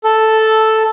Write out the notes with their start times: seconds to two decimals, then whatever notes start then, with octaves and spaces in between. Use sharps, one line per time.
0.04 A4